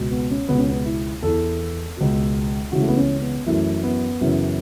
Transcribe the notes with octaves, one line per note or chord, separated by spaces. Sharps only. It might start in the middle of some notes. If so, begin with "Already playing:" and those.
Already playing: C#2 B2
B3
C#4
C#2 B2 B3
C#4
B3
E4
E2 E3 A4
C#2 B2
C#2 C#3 E3 F#4
A3
B3
C#4
B3
F#2 E3 A3
B3
F#2 C#3 E3